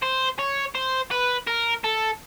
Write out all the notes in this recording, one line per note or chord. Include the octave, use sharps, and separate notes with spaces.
C5
C#5
C5
B4
A#4
A4